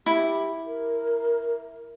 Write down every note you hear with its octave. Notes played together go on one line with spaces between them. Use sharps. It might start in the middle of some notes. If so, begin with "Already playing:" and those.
E4 G4
A#4